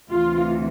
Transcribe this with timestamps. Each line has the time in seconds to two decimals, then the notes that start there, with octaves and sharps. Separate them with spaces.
0.11 D2 C3 E3 F4